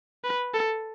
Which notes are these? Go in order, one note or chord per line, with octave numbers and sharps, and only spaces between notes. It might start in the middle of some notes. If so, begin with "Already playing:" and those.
B4
A4